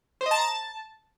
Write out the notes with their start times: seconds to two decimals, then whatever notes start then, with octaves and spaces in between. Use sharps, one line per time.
0.21 C5
0.26 D#5
0.31 A5
0.36 A#5
0.41 A5